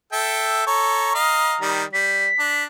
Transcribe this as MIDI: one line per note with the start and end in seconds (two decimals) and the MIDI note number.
0.13 0.65 69
0.13 0.65 76
0.13 0.65 79
0.67 1.12 69
0.67 1.12 73
0.67 1.82 82
1.15 1.56 75
1.15 1.56 77
1.61 1.84 51
1.61 1.84 55
1.93 2.28 55
1.93 2.64 95
2.39 2.65 62